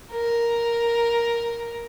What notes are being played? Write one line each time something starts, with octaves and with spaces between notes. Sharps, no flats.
A#4